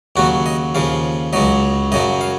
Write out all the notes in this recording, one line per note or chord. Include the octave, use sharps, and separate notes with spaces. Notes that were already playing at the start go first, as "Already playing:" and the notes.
D#2 C#3 F#3 F#4
D#5
D#2 C#3 F3 F5
C#2 C#3 F#3 D#5
F#2 C#3 F#3 D#5
F5